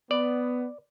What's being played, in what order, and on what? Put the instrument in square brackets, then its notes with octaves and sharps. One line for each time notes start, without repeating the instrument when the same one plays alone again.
[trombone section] B3 [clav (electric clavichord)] D5